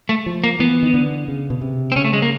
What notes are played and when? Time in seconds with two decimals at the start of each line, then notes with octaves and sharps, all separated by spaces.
0.09 A3
0.26 F3
0.44 A#3
0.59 E3 B3
0.83 D#3
0.94 D3
1.28 C#3
1.50 B2
1.61 C3
1.92 C4
1.96 C#3 C#4
2.05 A3
2.13 G#3
2.22 A#3